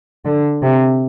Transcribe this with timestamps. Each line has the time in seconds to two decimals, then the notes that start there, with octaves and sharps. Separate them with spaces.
0.25 D3
0.62 C3